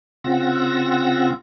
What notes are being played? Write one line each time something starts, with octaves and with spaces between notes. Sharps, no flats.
C#3 C4 F4 F#5 E6 A#6